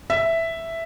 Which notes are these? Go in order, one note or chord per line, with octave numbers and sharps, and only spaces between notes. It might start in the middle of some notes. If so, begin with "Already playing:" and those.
E5